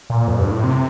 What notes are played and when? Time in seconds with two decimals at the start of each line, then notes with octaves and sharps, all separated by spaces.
0.10 A#2
0.28 F2
0.39 G2
0.51 A2
0.63 C3